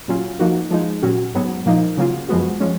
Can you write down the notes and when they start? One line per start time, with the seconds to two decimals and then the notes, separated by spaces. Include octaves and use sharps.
0.08 A#2 F#3 C#4 F4
0.39 F3 A#3 D#4 F#4
0.71 F3 G#3 D#4
1.02 A#2 F#3 C#4 F#4
1.34 G#2 F#3 B3
1.66 A#2 F3 A#3 D#4
1.97 C#3 F#3 A#3 F4
2.29 F#2 F3 G#3 B3 F#4
2.60 F3 G#3 C#4